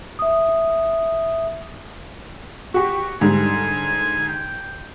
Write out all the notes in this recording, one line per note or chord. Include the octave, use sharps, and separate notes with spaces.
E5 D#6
F#4 G4 C#6
G#2 D3 G3 G#5
G5